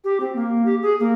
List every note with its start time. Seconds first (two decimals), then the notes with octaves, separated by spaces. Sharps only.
0.04 G4
0.20 C4
0.35 A#3
0.65 G4
0.82 G#4
1.00 A#3